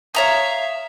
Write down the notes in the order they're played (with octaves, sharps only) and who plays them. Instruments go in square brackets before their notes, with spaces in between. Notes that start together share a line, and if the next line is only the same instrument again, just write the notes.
[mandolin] C#5 A#5 D#6 [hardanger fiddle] E5 F5